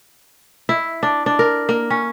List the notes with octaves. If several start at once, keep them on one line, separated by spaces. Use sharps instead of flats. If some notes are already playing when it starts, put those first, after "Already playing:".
E4
D4
D4
A#4
A#3
C#4